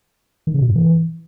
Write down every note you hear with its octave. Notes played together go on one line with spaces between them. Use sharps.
D#3
C#3
B2
G2
E3